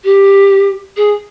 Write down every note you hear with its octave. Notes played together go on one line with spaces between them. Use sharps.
G4
G#4